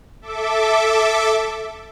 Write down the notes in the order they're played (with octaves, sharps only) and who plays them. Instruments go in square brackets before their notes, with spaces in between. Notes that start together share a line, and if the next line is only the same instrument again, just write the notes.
[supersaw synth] A4 E5 D6